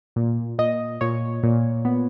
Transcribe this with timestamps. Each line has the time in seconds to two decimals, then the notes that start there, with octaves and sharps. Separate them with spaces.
0.16 A#2
0.59 A#2 D#5
1.01 A#2 C#5
1.43 A#2
1.85 B3